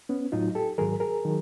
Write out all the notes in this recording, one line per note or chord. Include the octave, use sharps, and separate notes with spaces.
B3 C#4
A2 F#3 D#4 F4
G4 A4
G#2 D#3 F#3 G#4 A#4
G#4 A#4
D#3 F#3